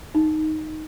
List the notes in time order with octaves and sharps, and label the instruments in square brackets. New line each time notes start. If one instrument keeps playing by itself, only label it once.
[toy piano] D#4